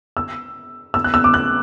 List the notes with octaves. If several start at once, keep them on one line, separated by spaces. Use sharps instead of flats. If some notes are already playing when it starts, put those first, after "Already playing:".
E6
E6
F#6
E6
D6
F#6